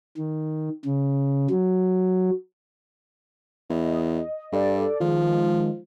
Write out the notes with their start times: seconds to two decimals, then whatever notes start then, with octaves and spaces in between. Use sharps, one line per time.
0.17 D#3
0.85 C#3
1.50 F#3
3.70 E2 D#5
4.52 G2 A4 D5
5.00 D#3 F3 G#3